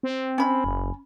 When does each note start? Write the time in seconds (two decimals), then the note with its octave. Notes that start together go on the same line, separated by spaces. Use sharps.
0.03 C4
0.38 C#4 B5
0.64 F#1